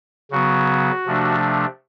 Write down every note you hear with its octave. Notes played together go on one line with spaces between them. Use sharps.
C#3 F#3 B3 F#4
C3 F3 A3 D4